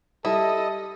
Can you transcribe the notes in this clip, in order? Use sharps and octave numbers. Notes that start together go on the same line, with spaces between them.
G3 E4 A4 D#5